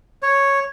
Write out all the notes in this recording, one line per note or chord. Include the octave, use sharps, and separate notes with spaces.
C#5